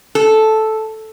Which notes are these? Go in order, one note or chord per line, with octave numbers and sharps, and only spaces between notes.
A4